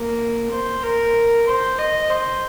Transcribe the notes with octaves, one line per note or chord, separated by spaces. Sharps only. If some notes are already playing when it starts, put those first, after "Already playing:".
Already playing: A#3
C5
A#4
C5
D#5
C5